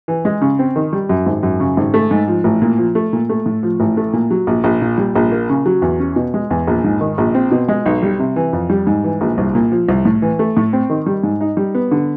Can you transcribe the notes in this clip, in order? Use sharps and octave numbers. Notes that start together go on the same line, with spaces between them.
E3
G#3
C#3
C4
D#3
G3
F#2
G#1
F#2
C#3
G#1
A3
G#2
F3
A1
A#2
F3
A3
A#2
A3
A2
F3
A1
A3
A#2
F#3
A#1
A#1
A#2
G3
A#1
A#3
C#3
F#3
E2
C#4
B2
G#3
E2
A#1
G#2
D#3
A#1
C4
B2
G#3
B1
G3
C3
E3
F2
G3
G#2
E3
A#1
C2
A#2
F3
C2
A2
E3
A3
A2
C4
D#3
G3
G#2
D#4
G3
B3
D3